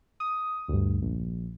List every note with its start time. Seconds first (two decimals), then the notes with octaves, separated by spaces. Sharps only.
0.20 D#6
0.68 D2 G2
1.02 A#1